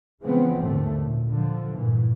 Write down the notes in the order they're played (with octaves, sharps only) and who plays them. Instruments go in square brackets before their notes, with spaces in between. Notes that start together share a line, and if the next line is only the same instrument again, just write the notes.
[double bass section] C#3 E3 F3 G#3 B3 C4
G#1 D#2 A2 D3 A3
A#2
D3 F3
G2 A#2 E3